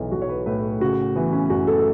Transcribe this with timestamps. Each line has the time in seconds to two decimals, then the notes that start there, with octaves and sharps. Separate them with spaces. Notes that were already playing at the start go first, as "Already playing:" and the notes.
Already playing: B1 E3
0.12 B1 F#4
0.22 C#5
0.29 B4
0.46 A2 B4
0.80 C#3 F#4
1.16 E3 B3
1.33 C#4
1.49 F#1 F#4
1.67 A4